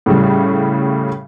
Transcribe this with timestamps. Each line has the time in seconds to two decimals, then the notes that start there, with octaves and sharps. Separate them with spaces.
0.06 A2 C#3 G3